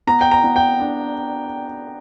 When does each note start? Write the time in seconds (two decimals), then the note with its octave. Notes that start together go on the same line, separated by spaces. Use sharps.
0.07 B3 A#5
0.21 G5
0.31 A#5
0.44 B3
0.56 G5
0.80 D4